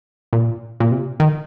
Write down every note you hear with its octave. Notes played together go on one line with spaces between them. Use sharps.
A#2
A#2
C3
D#3